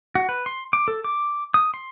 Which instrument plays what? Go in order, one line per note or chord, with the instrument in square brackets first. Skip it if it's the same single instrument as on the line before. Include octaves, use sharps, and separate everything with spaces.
[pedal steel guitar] F#4
B4
C6
D6
A4
D6
D#6
C6